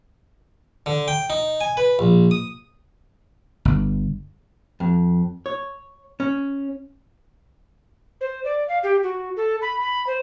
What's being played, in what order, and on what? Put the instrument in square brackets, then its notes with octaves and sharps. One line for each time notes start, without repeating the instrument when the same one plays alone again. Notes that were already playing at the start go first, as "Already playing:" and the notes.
[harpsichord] D3
G5
D#4
G#5
B4
A#1
D#6
[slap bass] G1
[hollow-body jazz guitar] F2
C#5
C#4
[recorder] C5
D5
F5
G4
F#4
A4
B5
B5
C5